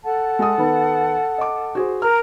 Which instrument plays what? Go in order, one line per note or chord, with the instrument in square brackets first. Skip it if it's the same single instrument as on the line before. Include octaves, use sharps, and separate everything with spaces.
[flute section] A4 F#5 A5
[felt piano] G#3 D#6
D#3 B3
D#5 D6
F#4 G#4 C5
[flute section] A#4 A#5 [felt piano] F6